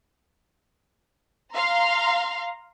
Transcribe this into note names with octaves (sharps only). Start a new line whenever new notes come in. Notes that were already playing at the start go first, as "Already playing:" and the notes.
F5 A#5 C6